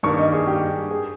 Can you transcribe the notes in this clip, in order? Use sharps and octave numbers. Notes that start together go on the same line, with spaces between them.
G2 D#3 A#3 C#6
D#5
G#4
G4
G#4